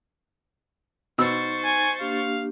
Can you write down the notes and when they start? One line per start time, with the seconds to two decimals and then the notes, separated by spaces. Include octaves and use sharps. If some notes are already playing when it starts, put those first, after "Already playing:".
1.18 B2 D#4 C5 C#6 E6 A6
1.65 G#5
2.01 A#3 D4 G4 F5